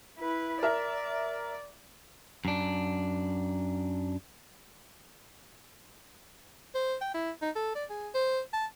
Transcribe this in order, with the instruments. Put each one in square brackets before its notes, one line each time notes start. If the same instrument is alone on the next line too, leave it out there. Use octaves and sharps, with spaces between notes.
[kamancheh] E4 B4
[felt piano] A#4 E5 A#5 [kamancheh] D5
[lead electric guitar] F#2 D4
[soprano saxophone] C5
G5
E4
D#4
A4
D5
G#4
C5
A5